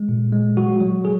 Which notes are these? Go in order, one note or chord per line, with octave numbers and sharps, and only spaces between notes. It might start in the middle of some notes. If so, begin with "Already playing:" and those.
Already playing: G#3
A#2
G#3
F#3 F#4
F#3
F#3 G#4